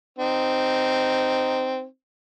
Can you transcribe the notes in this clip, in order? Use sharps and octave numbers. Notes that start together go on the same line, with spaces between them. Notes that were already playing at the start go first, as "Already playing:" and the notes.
C4 D#4